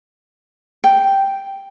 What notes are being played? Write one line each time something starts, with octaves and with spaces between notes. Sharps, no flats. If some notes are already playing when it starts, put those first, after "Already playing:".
G5